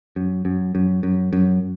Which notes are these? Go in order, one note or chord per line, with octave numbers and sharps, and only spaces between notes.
F#2
F#2
F#2
F#2
F#2